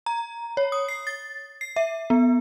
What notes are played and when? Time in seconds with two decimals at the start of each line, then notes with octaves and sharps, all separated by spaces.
0.06 A#5
0.57 C#5
0.72 D#6
0.88 C7
1.07 A6
1.61 C7
1.76 E5
2.10 B3